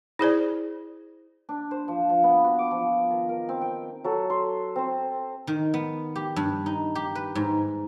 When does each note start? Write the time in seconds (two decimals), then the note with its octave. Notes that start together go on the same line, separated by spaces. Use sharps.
0.19 E4 G#4 C5 D5
1.49 D4
1.71 C5
1.88 F3
2.10 F3
2.23 B3
2.44 F#4
2.59 D6
2.71 F3
3.10 D#3
3.29 A#4
3.49 C4
3.61 G5
4.04 F#3 A4
4.30 C6
4.76 C4 C5
5.47 D#3
5.74 B3
6.16 G4
6.36 G2
6.66 D#4
6.95 G4
7.15 B4
7.35 G#2